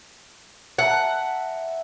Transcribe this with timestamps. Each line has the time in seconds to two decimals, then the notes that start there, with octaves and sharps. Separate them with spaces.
0.78 E5 F#5 A5 A#5